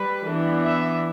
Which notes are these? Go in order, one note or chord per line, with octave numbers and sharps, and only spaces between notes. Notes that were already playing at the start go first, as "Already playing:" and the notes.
Already playing: G3 B4
E3 B3 D4
E5